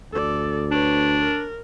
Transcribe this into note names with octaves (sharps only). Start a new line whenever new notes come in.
D2 A4 D5
D4 B4 C#5
A#4